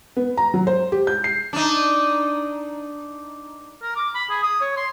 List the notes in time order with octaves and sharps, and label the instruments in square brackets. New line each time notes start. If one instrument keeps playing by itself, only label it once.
[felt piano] B3
A#5
F#3
C5
G4
G6
C7
[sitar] D4 D#4
[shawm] A#4
D6
B5
G#4
D#6
C#5
C6